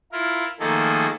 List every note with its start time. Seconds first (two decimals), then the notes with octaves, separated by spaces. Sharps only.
0.12 E4 F4 A#4
0.60 D#3 F3 A3 A#3 G#4 A4